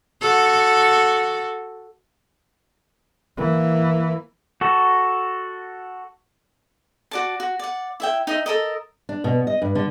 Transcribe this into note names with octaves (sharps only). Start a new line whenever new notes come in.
F#4 A4
E3 A#3
F#4 A4
F#4 D5 A5
F#4
D5 F#5
E4 E5 G5
D#4 D#5 E5
A4 A#4 D#5
D4
B2
D#5
G2
D3